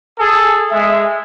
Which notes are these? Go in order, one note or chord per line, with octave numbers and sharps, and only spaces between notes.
G#4 A4 G#5
G#3 E5